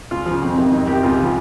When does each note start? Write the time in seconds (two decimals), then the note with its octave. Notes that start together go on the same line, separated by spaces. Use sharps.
0.11 C#2 F4
0.26 C#3 F3
0.42 F2
0.57 C3 D#3
0.72 F2 D#4
0.88 C3 D#3 G4
1.03 C#2 F4
1.19 C#3 F3